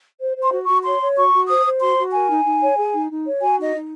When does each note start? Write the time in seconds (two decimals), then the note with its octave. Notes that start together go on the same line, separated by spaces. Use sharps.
0.21 C5
0.37 C5
0.42 C6
0.52 F#4
0.63 C#6
0.68 F#4
0.85 C#5 C6
1.01 C#5
1.16 F#4 C#6
1.33 F#4
1.49 C5 D#6
1.65 C5
1.81 F#4 C6
1.97 F#4
2.12 A#4 G#5
2.29 D#4
2.44 D#4
2.61 C#5
2.77 G#4
2.93 D#4
3.09 D#4
3.25 C#5
3.40 F#4 G#5
3.57 D#4 D#5
3.74 D#4